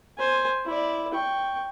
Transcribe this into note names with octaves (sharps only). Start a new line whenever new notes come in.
C5 G#5
E4 D5
G5 C#6